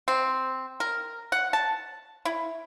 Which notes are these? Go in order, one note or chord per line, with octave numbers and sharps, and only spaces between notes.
C4
A#4
F#5
A5
E4